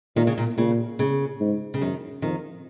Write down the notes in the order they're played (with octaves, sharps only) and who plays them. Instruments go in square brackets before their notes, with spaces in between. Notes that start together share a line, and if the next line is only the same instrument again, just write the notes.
[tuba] A#2 [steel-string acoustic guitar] D#3
[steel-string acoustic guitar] C#3
A#2
[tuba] A#2 [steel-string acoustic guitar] C#3
[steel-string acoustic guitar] C#3
[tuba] G#2
[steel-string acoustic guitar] C#3
[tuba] F#2 [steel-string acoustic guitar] D#3
[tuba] F2 [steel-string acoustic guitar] D#3